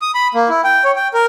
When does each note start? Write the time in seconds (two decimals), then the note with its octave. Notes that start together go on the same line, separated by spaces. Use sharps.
0.02 D#6
0.14 B5
0.34 A#3
0.49 E4
0.64 G5
0.84 C#5
0.96 G5
1.14 A#4